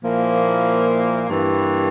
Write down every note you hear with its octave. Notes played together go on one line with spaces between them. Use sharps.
A#2 F3 A#3 E4
G2 E3 A#3